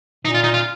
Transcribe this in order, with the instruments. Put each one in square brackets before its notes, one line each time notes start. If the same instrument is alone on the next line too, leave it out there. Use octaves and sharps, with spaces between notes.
[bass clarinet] A#2 [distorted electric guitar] D#4
[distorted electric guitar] F4
D#4
F4